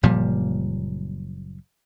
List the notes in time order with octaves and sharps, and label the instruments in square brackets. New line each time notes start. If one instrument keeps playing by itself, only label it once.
[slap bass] F#1 A#2 F3 G3